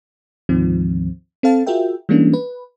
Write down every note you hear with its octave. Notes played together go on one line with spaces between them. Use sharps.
D2 G#2 D#3 F3 C4
C4 A4 F5 A5
F4 F#4 G#4 A#4 E5 G5
E3 G3 G#3 A#3 C#4 D4
B4